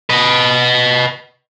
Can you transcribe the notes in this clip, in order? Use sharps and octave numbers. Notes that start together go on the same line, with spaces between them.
B4 D#5